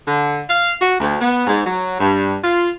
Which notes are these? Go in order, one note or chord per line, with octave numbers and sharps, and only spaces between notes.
D3
F5
F#4
D2
B3
G#2
F#3
G2
F4